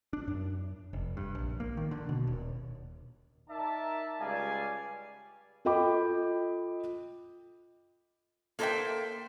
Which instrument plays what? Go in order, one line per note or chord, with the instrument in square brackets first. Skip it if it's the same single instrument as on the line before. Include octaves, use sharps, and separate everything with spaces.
[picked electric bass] D4
F#2
F1
G2
A#1
A#3
D#3
D3
B2
D#1
[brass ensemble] D#4 A#4 D5 E5 A5
C#2 G3 D5 F5 G#5
[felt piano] F4 A4 D#5 G5 B5 D6
[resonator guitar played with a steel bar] A#3 A4 C5 C#5 E5 G5